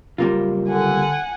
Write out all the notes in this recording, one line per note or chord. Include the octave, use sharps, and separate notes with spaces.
F#1 G3 A#3 C4 F4
D3 F#5 G#5